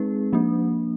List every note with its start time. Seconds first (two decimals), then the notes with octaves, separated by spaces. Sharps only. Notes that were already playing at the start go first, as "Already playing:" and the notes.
Already playing: G#3 C4 D#4 G#4 B4
0.33 F3 A#3 D4